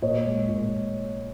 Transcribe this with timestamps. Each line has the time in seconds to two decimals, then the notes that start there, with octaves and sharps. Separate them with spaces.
0.02 A#2 C#5 D#5
0.25 G#3
0.49 A#2